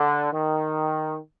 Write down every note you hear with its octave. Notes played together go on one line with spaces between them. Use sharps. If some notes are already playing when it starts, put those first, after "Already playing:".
Already playing: D3
D#3